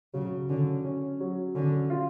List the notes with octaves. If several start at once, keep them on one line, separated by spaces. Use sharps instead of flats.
C#3 F#3
D3 C#4
C#4
F#3
D3 C#4
F4